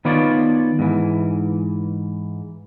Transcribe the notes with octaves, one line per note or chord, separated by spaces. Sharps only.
D#3 B3 F4 C#5 D5
G#2 E3